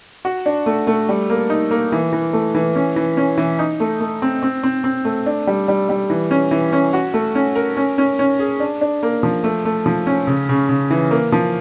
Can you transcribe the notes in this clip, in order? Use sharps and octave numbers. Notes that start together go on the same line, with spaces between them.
F#4
D4
A3
A3
G3
A#3
D#4
A#3
E3
E3
A3
E3
C#4
E3
C#4
E3
D#4
A3
A3
C4
C4
C4
C4
A3
D4
G3
G3
G3
E3
C#4
E3
C#4
F#4
A3
C#4
A#4
C#4
C#4
C#4
G#4
D4
D4
A#3
F3
A3
A3
F3
C#4
C#3
C#3
C#3
E3
A#3
F3